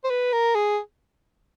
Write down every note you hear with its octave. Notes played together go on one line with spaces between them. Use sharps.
C5
B4
A#4
G#4